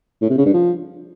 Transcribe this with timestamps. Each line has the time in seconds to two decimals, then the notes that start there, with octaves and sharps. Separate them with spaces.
0.22 A2
0.30 C3
0.38 C#3
0.46 G2
0.54 F3